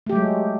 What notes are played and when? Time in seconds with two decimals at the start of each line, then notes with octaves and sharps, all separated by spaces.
0.06 A3
0.09 G4
0.12 F#3
0.15 G#3